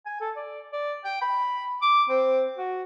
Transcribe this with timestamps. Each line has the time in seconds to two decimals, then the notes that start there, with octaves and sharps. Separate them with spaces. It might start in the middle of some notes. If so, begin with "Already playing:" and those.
0.06 G#5
0.20 A4
0.36 D5
0.73 D5
1.04 G5
1.22 B5
1.82 D6
2.09 C4
2.57 F#4